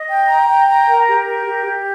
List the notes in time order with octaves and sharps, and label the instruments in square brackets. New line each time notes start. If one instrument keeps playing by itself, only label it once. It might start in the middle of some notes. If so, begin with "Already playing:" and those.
Already playing: [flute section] D#5
G5
A#5
G5
A#5
A#4
G4
A#4
G4
G4